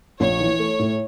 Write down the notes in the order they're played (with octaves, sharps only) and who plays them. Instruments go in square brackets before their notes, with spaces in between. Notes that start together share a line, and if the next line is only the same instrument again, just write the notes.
[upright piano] A#1 [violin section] C#5
[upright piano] E3
A3
A2